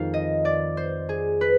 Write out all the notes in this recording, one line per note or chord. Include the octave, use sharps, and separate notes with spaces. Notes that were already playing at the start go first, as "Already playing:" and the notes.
Already playing: F2 D#3 G#3 F5
D#5
D5
C5
G#4
B4